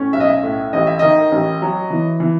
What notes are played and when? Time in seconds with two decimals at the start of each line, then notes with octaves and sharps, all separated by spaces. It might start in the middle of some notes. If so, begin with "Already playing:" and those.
Already playing: A2 C#4
0.13 B1 E5
0.20 D#5
0.29 E5
0.43 A2
0.73 A1 D#5
0.87 E5
0.99 D#3 D#5
1.32 A1
1.62 F#3
1.90 E3
2.20 E3